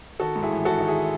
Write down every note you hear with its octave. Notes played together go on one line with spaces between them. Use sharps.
D#3 F#4 A4
G#2
E4 G#4
A1
A1 F#4 A4
D#3
E4 G#4